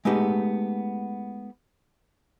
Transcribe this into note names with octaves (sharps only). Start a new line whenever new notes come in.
G#3 A3 B3 D#4 G4